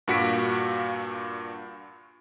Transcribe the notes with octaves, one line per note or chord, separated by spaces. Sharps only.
G2 A#2 F#4 F5 B6 D7